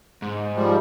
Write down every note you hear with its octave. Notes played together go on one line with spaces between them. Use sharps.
G#2
F3 G3 G#3